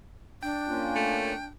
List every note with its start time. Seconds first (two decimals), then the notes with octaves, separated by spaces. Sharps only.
0.43 D4 G5
0.67 A#3 C#4 F4
0.96 A3